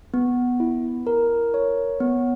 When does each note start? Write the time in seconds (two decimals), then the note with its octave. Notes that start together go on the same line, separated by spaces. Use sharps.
0.14 B3
0.60 E4
1.07 A#4
1.54 C#5
2.00 B3